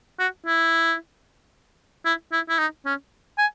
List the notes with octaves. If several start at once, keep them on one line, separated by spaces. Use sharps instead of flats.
F#4
E4
E4
E4
E4
D#4
C#4
G#5